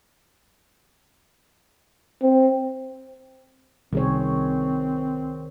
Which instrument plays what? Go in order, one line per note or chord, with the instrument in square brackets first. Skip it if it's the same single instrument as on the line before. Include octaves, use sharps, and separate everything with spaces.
[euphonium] C4
[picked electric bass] C2 [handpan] D#3 G#4 C#5 [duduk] C4